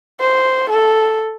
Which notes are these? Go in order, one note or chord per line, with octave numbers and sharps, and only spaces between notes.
C5
A4